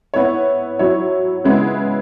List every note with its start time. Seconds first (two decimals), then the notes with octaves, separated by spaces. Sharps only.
0.14 B3 E4 C#5
0.79 F#3 E4 C#5
1.44 C#3 G#3 B3 E4 B4